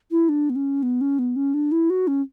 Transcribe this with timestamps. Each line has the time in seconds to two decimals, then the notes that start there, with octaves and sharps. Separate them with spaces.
0.11 E4
0.29 D4
0.50 B3
0.56 C#4
0.83 B3
1.01 C#4
1.19 B3
1.36 C#4
1.54 D4
1.72 E4
1.90 F#4
2.07 C#4